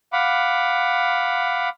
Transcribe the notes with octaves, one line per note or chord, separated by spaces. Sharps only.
F5 F#5 B5 D6